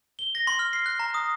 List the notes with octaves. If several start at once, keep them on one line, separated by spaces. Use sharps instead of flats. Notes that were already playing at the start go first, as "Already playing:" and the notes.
G7
A#6
C6
F6
C7
F#6
A#5
D#6